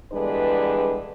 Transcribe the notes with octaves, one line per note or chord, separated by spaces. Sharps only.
E2 D3 G3 G#3 D4 B4